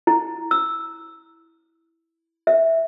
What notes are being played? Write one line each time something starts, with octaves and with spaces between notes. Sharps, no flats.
E4
E6
E5